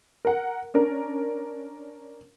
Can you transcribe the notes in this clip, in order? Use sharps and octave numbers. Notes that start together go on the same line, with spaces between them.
A#4 F#5
C#4 D4 A#4